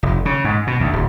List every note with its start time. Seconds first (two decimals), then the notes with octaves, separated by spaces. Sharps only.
0.03 F1
0.25 C#3
0.44 G#2
0.67 B2
0.80 D2
0.93 D1